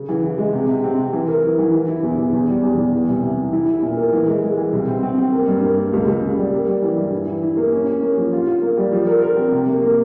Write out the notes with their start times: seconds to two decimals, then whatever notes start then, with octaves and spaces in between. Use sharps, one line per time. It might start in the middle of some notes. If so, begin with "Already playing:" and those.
Already playing: C#3
0.09 E3
0.23 E3
0.38 G#3
0.53 C3
0.69 C3
0.84 C4
0.98 C3
1.13 E3
1.28 A#4
1.43 E3
1.59 E3
1.73 E3
1.88 E4
2.03 E2
2.18 E2
2.33 E2
2.48 G3
2.62 E2
2.77 E2
2.93 E3
3.08 C2
3.23 C3
3.38 E3
3.53 E4
3.68 E4
3.82 A#2
3.97 A#4
4.12 E3
4.28 G#3
4.43 G#3
4.57 E3
4.73 C2
4.88 C4
5.03 C4
5.18 C4
5.32 A#3
5.47 G2
5.63 A#3
5.78 A#3
5.93 C#2
6.07 C#2
6.23 C#2
6.37 G3
6.53 A#3
6.67 G3
6.82 E3
6.97 G2
7.13 E4
7.27 E3
7.43 E4
7.57 A#3
7.72 C#4
7.87 C#4
8.02 A#3
8.17 F3
8.33 F4
8.47 F4
8.62 A#3
8.77 G3
8.92 F3
9.07 A#4
9.22 A#4
9.37 C4
9.52 C3
9.67 A#3
9.82 A#3